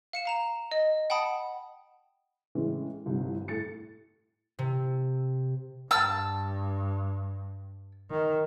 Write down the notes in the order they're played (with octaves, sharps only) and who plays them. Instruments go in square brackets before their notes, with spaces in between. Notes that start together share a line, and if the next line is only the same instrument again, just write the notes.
[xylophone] F5 C#7 E7
F5 A#5 E7
D#5
F#5 G5 A5 B5 D#6
[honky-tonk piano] A2 C#3 E3 G#3 C#4
G1 C2 G2 C3 D#3 F3
A2 A4 A6 C#7
[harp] C3
[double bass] G2 [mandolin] A5 E6
[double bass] D#3